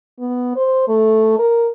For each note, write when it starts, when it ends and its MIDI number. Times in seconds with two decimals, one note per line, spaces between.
0.19 0.55 59
0.56 0.85 72
0.88 1.37 57
1.39 1.69 70